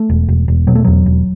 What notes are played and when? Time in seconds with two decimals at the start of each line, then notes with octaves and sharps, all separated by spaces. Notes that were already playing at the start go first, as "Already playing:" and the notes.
Already playing: A3
0.10 E1
0.28 E1
0.48 E1
0.67 B2 F#3
0.75 A3
0.84 E2 F#3
1.06 E1